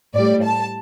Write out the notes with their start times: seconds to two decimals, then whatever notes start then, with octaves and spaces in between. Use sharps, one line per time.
0.15 A2 G3 D5
0.43 A5